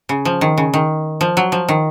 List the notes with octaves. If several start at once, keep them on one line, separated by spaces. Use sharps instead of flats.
C#3
F3
D#3
C#3
D#3
F3
F#3
F3
D#3